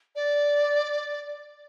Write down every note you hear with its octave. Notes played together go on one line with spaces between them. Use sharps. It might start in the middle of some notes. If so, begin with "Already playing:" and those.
D5